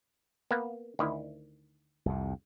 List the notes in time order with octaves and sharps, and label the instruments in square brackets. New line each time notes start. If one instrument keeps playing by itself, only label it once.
[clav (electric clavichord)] A#3 B3
D2 D#3 E4
[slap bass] C2 F2 C3